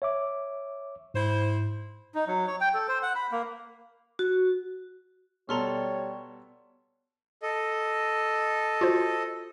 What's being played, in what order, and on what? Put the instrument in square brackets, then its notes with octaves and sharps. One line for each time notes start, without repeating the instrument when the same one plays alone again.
[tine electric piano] C#5 E5 D6
[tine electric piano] G#2 [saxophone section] E4 C5
[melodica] D#4
F#3
C#5
G5
A4
C5
F#5
B5
A#3
[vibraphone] F#4
[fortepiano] B2 A4 [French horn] G3 [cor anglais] C#5 [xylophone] A#5 C6 F6
[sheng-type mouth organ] A4 D#5
[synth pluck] F4 F#4 C5